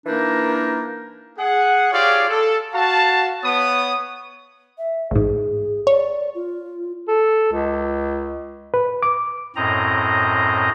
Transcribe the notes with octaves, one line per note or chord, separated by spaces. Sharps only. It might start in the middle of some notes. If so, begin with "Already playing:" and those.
E3 A#3 D4 D#4 A#4
G#4 F#5
F4 G4 G#4 C#5 D5 F5
A4
F#4 F5 A5
B3 C#5 D#6
E5
A1 G#2 G#4
C#5 D5
F4
A4
C#2
B4
D6
F#2 A2 C4 D#5 A#5